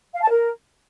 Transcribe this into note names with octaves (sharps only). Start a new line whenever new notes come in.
F5
A5
A#4